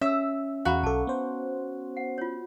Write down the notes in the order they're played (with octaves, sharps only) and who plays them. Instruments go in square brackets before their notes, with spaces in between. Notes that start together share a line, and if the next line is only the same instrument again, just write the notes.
[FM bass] C#4 [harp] E5 [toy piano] D#6 E6
[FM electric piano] E2 F#5 [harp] F#4 [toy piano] F5 A#5 B5
[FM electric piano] B1 A4 [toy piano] A5 D6
[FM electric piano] B3 C5
[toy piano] F#5
F4 C#5